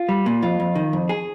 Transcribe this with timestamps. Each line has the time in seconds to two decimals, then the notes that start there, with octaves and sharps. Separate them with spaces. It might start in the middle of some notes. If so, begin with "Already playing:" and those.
Already playing: F4
0.09 G3
0.26 A#2
0.42 F2 F4
0.60 F2
0.75 D#3
0.93 F2
1.09 G#4